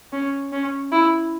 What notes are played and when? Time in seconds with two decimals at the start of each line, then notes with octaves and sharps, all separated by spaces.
0.12 C#4
0.52 C#4
0.92 E4